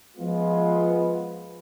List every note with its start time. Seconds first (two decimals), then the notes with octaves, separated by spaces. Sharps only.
0.16 F3 G#3 B3 F4